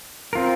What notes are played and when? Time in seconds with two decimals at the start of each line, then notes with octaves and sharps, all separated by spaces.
0.33 C4 F4 A#4